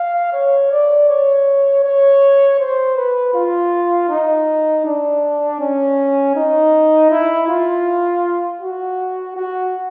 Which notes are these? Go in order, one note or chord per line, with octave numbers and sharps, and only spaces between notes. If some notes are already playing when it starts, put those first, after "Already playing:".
Already playing: F5
C#5
D5
C#5
C#5
C5
B4
F4
D#4
D4
C#4
D#4
E4
F4
F#4
F#4